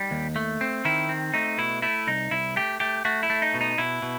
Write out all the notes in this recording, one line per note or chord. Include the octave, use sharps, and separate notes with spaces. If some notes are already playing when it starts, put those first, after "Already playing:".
Already playing: G3 D#4
D#2
A3
C4
D#3 E4
C4
A3 D#4
B2 E4
A3 E4
C2 D#4
C2 E4
A3 G4
A3 G4
A3 F#4
E4
A3
D#4
B2
D#4
B2 E4
B2